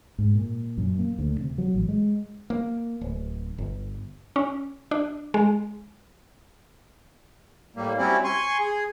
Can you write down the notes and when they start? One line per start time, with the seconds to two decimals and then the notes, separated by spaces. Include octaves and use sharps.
0.19 G#2
0.35 A#2
0.78 F#2
0.99 A#3
1.19 D2
1.40 C3
1.58 F#3
1.74 A1
1.89 G#3
2.50 A#3
3.01 D1
3.58 G1
4.36 C#4
4.91 D4
5.34 G#3
7.76 A2 G3 A#3
7.98 F#3 G3 C4 C#4 E4
8.24 G#5 C6 C#6
8.60 G#4